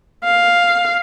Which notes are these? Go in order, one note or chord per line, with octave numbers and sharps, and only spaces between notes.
F5